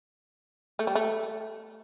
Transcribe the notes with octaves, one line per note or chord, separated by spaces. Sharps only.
A3
G3
A3